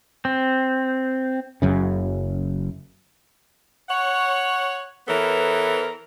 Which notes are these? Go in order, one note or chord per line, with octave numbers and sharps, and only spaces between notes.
C4
F#1 F#2 C#3
C#5 F#5
E3 B3 A4 A#4 C#5